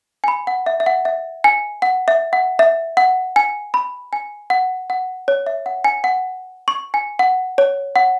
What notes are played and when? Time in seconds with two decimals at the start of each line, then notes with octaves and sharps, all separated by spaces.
0.24 G#5
0.28 B5
0.47 F#5
0.66 E5
0.80 E5
0.86 F#5
1.05 E5
1.44 G#5
1.82 F#5
2.08 E5
2.33 F#5
2.59 E5
2.97 F#5
3.36 G#5
3.74 B5
4.13 G#5
4.50 F#5
4.90 F#5
5.28 C#5
5.47 E5
5.66 F#5
5.84 G#5
6.04 F#5
6.68 C#6
6.94 G#5
7.19 F#5
7.58 C#5
7.96 F#5